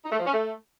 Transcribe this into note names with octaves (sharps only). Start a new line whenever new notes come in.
D#4
A3
F3
C#4
A3